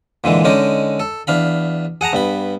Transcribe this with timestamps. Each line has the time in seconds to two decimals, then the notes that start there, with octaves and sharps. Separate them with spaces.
0.24 A#2 D3 E3 G#3
0.45 D3 G#3 C#4 D#4 D6
1.00 A4
1.27 E2 D4 F5 B5
2.01 G#4 F#5 A5 A#5
2.13 G2 B3 B5